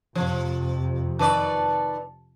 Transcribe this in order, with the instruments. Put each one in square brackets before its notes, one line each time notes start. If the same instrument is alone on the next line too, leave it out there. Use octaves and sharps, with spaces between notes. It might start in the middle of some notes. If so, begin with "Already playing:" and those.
[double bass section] F2 C3 [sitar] F3
[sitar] D#3 B4 D5 [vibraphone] A5